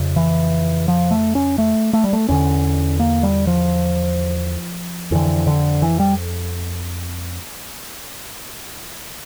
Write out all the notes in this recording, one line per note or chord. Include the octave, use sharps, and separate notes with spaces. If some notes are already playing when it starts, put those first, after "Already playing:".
Already playing: F2 C#3
E3
F3
A3
C#4
A3
A3
G3
A3
E2 D3 C#4
A#3
G3
F3
F2 D3 E3
D3
E3
G3